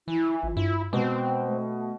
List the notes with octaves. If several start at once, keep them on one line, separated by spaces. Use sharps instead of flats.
E3 E4
A1 F4
G2 E4
B2 G#3 C4 B4
A3